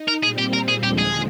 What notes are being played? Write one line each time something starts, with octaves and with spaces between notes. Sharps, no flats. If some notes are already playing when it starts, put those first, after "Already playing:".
Already playing: D#4
A#4
A#2 G3 C4 G#4
G4
A#4
G#4
D#2 D3 F3 G#3 G4
G#4